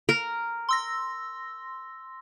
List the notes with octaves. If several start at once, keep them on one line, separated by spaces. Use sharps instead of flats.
A#4
C6 E6 A#6